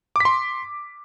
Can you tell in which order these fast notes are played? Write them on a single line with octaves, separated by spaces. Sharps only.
D6 B6 C6